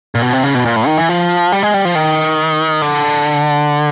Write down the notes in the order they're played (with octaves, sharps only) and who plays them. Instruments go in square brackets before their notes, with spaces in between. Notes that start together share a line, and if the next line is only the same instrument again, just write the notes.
[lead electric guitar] A#2
B2
C3
C#3
B2
A#2
A2
D#3
E3
F3
G3
G#3
G3
F3
D#3
D3